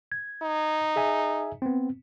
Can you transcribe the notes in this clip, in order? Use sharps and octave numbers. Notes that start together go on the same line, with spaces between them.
G#6
D#4
G#4 E5 G#5
B3 C4